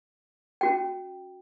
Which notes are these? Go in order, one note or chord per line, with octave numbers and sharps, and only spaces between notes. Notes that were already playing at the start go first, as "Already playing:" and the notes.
C#4 F#4 G5